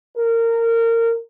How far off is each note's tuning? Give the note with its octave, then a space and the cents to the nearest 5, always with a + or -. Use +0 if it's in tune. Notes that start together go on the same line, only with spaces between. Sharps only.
A#4 -20